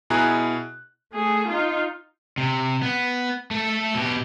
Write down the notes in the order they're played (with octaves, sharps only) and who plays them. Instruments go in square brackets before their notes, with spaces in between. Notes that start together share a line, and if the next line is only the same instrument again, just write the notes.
[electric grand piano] B2 E4 G#4 G#5 A#5 F#6
[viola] A3 G#4
D#4 F4
[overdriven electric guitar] C3
B3
A3 A4
B2 G4